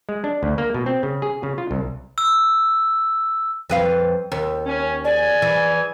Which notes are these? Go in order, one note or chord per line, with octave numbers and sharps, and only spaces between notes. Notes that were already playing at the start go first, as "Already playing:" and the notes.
G#3
D4
D2
A#3
B2
C4
C#3
G#4
C#3
F4
C2
E6
F2 B4 F5
D#2
C#4
G#4 D5 G#5
E3